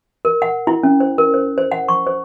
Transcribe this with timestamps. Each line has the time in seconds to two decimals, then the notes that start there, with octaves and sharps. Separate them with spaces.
0.25 A#4
0.42 F#5
0.67 E4
0.83 C#4
1.00 C5
1.18 A#4
1.34 C5
1.58 C5
1.72 F#5
1.89 C#6
2.07 C5